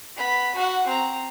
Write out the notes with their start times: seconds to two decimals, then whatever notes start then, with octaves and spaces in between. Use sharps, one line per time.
0.16 B3 B5
0.55 F#4 F#5
0.87 C4 A#5